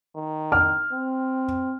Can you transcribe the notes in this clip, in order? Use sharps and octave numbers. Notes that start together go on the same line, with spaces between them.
D#3
F6
C4